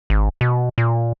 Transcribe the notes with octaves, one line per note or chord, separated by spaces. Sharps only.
G#1
B2
A#2